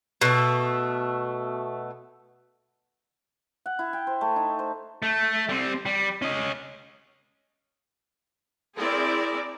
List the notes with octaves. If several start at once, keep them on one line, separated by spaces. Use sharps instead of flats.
B2 A3
F#5
E4
G5
C5
A3
D#4
C5
A3
G3 C4
G3
C#4 D#5
C4 E4 G#4 A#4 D5